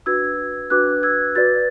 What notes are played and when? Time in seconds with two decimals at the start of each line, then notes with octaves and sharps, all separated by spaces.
0.06 D4 F#4 B4 E6 G#6
0.70 D4 F#4 B4 D6 F#6
1.03 E6 G#6
1.35 F#4 B4 D5 A6